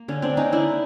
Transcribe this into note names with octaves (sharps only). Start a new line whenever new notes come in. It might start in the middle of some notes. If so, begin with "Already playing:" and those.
Already playing: A#3
D3 C#4
C4 D4
A#3
C#4 D#4
D3 D4 E4